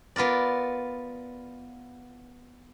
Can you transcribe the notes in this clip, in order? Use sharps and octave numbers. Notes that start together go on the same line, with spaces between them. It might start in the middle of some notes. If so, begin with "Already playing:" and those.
B3 F4 A#4 D5